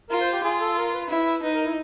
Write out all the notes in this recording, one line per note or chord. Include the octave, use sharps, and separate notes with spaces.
F4 A#4
C5
G4
F4 G#4
A4
A#4
B4
E4
D#4 B4
A#4
E4